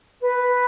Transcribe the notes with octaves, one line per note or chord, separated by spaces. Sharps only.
B4